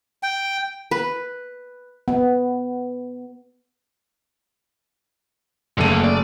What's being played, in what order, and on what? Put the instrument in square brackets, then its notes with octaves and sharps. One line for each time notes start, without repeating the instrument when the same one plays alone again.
[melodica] G5
[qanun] B4
[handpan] B3
[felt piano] F#1 A3 D#7 [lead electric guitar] D3 A#3
[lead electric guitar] D5